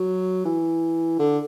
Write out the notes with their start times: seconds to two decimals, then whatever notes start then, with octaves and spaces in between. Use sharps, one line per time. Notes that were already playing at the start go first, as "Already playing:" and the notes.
Already playing: F#3
0.45 E3
1.19 D3